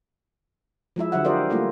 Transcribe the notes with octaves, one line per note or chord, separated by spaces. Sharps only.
F3 G#3 E4 E5
D3 F#3 E5 F#5
F4 G4 A#4 C5 D5 D#5
G3 A3 A#3 E4 F4